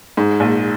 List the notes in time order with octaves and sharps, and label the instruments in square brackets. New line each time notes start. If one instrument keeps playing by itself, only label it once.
[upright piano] G#2
A#1